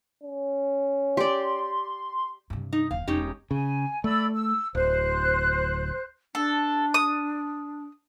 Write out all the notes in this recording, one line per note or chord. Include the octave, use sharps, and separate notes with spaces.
C#4
G4 D5 C6
G2 C3
D#4
D#1 F5
E1 C#4 D#4 G4
C#3 G#5
A3 D5 B5 E6
E6
D1 C5 F#6
D4 A4
D#6